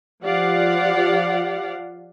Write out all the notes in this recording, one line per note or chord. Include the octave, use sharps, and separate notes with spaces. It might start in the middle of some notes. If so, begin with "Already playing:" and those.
F3 G4 D5 F5 F#5